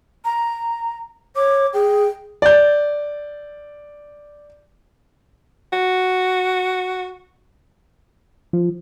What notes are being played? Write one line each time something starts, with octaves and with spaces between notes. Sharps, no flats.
A#5
C#5 D6
G#4 G5
D5 G6
F#4
F3